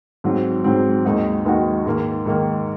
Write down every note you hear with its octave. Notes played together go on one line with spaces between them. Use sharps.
G#2 F#3 C4
G#2 F#3 C4
D#2 D#3 G#3 D#4 F#4
D#2 D#3 G#3 D#4 F#4
G#2 D#3 A#3
G#2 D#3 A#3